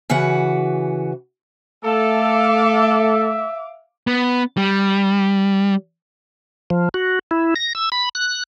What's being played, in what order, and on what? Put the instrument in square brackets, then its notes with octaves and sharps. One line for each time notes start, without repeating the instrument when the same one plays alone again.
[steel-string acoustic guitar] C#3 E3 F#4 B4 F#5
[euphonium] A3 [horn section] A4 [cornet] E5 [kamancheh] F5 D6
[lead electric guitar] B3
G3
[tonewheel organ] F3
F#4
E4
A#6
E6
B5
F#6